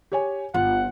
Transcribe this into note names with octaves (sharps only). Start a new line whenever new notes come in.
G4 C#5 G#5
G1 F4 F#5